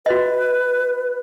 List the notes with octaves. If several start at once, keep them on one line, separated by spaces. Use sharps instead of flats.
F#4 B4 D#5